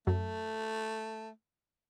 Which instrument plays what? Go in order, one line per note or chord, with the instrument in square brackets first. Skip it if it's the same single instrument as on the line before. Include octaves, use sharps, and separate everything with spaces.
[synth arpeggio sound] F#2 F#3 [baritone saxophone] A3